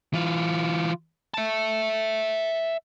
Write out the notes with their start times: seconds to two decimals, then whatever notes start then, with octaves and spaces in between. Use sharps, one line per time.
0.13 E3 F4
1.34 E5 A5